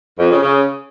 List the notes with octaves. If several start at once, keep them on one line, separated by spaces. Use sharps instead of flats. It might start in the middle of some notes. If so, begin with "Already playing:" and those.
F2
C#3
C#3